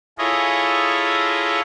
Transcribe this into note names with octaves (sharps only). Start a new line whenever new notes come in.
E4 F4 G#4 A4 C#5 D#5